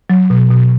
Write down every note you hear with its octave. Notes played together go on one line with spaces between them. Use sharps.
F#3
B2
B2